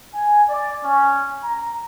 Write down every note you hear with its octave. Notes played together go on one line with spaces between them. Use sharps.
G#5
D5
C#4
A#5